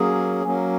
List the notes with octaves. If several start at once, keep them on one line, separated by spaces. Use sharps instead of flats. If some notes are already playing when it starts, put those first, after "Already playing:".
Already playing: F#3 A#3 C#4 G#4
F#3 A#3 C#4